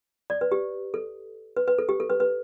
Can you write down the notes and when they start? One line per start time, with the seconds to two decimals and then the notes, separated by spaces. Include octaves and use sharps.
0.30 D5
0.41 B4
0.52 G4
0.94 A4
1.57 B4
1.68 B4
1.78 A4
1.89 G4
2.00 A4
2.10 B4
2.20 B4